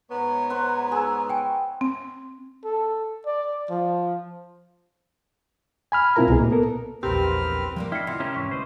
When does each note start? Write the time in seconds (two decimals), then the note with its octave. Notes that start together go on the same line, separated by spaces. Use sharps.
0.11 G#2 B3 C#5 A#5
0.50 B4 C5 F#5
0.92 G#4 E6
1.29 G5 G#5
1.81 C4
2.64 A4
3.26 D5
3.70 F3
5.92 G#5 B5 F6
6.16 B2 C4 E4 F4 A#4 A#5
6.28 C2 B2 G#4
6.39 A#2 A#3
6.51 B3 A4 A#4
7.03 A#1 E2 C4 G4 A#4 B4 F6
7.76 C3 F3 G3 A#3
7.92 D4 E4 D#5 F#5 G5 F6 C7 C#7
8.07 D2 C3 F4
8.20 C#4 E4 A#4 G5
8.34 E2 G#2 E3 C#6 B6
8.51 D2 B4 C5 D#5